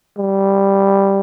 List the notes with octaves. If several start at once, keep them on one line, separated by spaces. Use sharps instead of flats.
G3